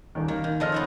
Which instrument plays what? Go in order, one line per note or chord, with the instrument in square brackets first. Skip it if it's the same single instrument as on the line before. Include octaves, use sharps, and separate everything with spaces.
[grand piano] D#1 D#3
[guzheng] D#3 [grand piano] A#3
[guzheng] D#3
[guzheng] C#3 F3 [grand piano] A4 D#5 F6
[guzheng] B3 C5 C#5